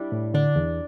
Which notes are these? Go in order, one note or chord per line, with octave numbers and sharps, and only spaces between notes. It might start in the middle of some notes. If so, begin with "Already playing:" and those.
Already playing: G3 D4 E4
A2
D3 D4
E2